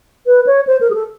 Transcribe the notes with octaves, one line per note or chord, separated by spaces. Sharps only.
B4
C#5
C5
A#4
G#4
A4